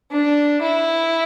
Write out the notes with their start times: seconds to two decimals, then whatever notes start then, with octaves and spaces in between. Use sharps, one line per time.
0.12 D4
0.62 E4